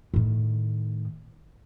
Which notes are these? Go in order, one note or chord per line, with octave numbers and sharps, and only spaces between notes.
A2 D#3